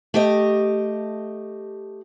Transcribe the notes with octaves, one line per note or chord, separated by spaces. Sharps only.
A3 G4 D#5